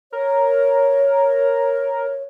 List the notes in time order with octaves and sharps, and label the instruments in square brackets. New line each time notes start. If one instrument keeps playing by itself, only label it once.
[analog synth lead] A#4 [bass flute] C#5